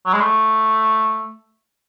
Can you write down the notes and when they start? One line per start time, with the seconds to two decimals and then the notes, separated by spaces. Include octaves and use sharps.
0.06 F#3
0.13 G#3
0.21 A3